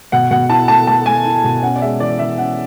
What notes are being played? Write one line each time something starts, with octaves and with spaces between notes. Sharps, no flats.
B2 F#5
B2 F#5
E4 A5
A3 A5
A3 A5
A3 G#5
E4
B2
C#4 F#5
D5
G#3 E5
E3 D5
E3 E5
C#4 F#5